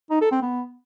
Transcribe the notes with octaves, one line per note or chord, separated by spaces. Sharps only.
D#4
A4
C4
B3